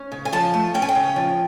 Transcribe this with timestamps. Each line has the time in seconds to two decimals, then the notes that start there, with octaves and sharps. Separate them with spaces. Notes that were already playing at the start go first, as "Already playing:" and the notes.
Already playing: C#4
0.12 C#3
0.25 G#5
0.32 F3 A5
0.54 A3
0.74 C#4 G5
0.82 G#5
0.89 G5
0.95 C#3
1.16 F3